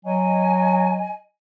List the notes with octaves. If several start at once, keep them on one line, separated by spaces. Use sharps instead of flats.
F#3 D#5 G#5